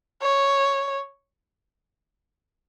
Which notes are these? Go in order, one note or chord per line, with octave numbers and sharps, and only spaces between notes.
C#5